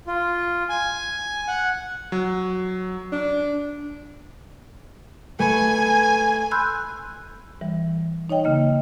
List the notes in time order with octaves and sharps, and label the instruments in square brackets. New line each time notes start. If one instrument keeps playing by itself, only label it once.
[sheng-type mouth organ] F4
G#5
F#5
[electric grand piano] F#3
[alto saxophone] D4
[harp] A3 B4 [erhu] G#5
[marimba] B5 C6 E6 F#6 G6
E3 G3
D#4 C#5 D#5 G5
C#3 A#3 D#5